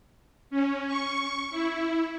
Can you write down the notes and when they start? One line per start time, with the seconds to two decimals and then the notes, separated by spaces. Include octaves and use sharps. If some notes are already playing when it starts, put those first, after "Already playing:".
0.50 C#4
0.87 C#6
1.50 E4